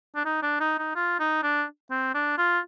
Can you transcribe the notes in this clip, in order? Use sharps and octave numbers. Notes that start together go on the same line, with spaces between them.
D4
D#4
D4
D#4
D#4
F4
D#4
D4
C4
D4
F4